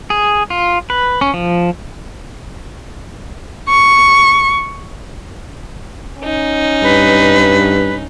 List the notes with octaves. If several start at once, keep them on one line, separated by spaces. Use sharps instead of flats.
G#4
F4
B4
C#4
F3
C#6
C#4 D#4
G2 B4